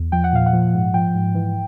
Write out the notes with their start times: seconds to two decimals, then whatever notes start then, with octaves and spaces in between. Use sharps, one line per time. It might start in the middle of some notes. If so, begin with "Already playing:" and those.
Already playing: E2
0.12 F3 G5
0.24 F#5
0.33 A#2 F5
0.46 F#5
0.53 F3
0.74 G#2
0.94 F3 G5
1.15 G#2
1.35 E3